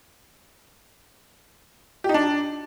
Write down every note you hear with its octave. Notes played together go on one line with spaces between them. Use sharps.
G4
D#4
D4